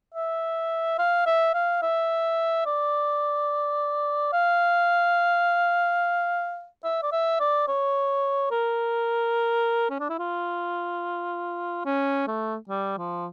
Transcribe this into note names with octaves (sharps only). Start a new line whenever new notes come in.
E5
F5
E5
F5
E5
D5
F5
E5
D5
E5
D5
C#5
A#4
C#4
D4
E4
F4
C#4
A3
G3
F3